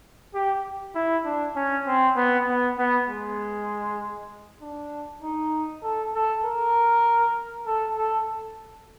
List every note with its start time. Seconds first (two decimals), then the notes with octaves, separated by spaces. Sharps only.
0.34 G4
0.95 E4
1.25 D4
1.56 C#4
1.87 C4
2.17 B3
2.48 B3
2.78 B3
3.09 G#3
4.62 D4
5.23 D#4
5.83 A4
6.15 A4
6.44 A#4
7.66 A4
7.97 A4